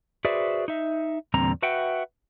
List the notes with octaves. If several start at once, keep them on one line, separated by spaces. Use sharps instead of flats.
F#4 G#4 B4 C5 D5 E5
D#4 E5
E2 A#2 D3 G3 C4 A#5
F#4 B4 E5 F#5 G5